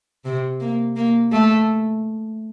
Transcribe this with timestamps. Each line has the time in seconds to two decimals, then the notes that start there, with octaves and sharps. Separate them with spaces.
0.25 C3
0.61 A#3
0.96 A#3
1.32 A3